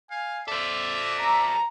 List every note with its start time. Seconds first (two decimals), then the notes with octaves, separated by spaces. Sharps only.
0.11 F5 G#5
0.48 A4 C5 D5 E5
1.19 A#5